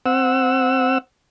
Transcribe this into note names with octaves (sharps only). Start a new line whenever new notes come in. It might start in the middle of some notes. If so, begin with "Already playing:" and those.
C4 F#5 E6